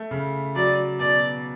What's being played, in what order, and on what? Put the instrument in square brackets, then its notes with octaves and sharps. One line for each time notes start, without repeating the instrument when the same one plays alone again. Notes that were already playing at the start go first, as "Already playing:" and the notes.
Already playing: [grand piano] A3
C#3
[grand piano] F#3 [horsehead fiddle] D5
[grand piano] B2 [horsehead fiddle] D5